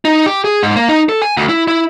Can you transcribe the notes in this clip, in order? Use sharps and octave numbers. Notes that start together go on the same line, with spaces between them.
D#4
G4
G#4
G#2
A#3
D#4
A4
G#5
D2
E4
E4